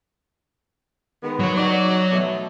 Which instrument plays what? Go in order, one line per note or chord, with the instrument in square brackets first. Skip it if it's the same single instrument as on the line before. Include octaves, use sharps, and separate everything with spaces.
[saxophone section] D#3 G#3 B3
[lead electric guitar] F#3 C#5
[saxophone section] D#4 F#4 D5
B2 A3